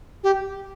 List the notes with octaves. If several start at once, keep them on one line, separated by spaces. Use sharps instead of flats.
G4